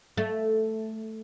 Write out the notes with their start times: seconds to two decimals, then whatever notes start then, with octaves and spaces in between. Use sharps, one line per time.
0.17 A3